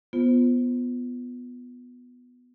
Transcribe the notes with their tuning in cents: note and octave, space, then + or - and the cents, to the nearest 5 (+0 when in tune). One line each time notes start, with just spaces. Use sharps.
B3 +0 F4 +0 C5 +0